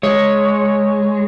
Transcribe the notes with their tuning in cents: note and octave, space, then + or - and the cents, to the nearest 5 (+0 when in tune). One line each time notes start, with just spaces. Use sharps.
G#3 +5 C#5 +0